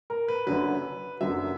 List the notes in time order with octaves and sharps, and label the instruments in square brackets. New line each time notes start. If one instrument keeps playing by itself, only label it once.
[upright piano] A#4
B4
F#1 F#2 D3 F#3 B4
F#1 F#2 D3 F#3 E5